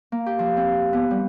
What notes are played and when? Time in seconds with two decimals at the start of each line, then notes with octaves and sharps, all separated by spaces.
0.12 A#3
0.26 G4
0.39 F3
0.57 C4
0.93 B3
1.11 G3